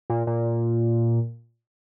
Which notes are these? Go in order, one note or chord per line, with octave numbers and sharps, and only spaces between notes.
A#2
A#2